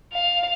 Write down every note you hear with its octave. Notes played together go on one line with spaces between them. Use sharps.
F5